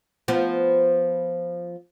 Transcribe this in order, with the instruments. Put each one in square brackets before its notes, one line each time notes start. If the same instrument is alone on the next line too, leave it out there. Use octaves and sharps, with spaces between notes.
[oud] F3 B3